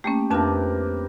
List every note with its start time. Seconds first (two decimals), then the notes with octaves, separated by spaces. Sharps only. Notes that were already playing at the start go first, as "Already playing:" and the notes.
0.04 A3 A#3 C#4 G4
0.30 F2 C3 A#3 D4 B4 A5